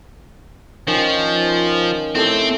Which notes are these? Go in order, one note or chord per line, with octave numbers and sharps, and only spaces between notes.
D#3 F3 C#4
A2 C4 A4 D6